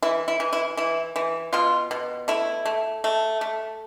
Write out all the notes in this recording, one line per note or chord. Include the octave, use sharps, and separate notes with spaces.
E3 E4
E4
E3
E4
E3 E4
E3
B2 F4
B2
A3 E4
A3
A3
A3